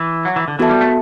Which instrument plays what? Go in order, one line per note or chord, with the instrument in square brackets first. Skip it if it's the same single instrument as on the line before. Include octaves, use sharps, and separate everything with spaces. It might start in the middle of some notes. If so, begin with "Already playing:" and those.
Already playing: [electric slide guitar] E3
F#3
E3
D3
[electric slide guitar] E3 [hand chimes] B3 F#4 A4 E5 A5
[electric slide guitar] G3
A3